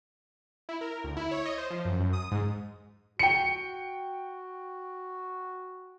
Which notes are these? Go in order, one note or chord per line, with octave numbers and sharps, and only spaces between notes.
E4
A#4
D2
E4
C#5
D#5
C5
F3
F#2
F#2
D#6
G#2
F#4 G5 C#7